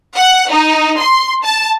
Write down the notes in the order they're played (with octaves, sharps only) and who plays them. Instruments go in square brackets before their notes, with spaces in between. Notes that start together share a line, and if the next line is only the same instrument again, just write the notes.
[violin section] F#5
D#4
C6
A5